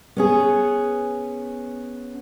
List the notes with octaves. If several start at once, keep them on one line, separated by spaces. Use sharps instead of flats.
B3 C#4 G#4